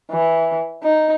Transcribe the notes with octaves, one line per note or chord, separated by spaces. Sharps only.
E3
D#4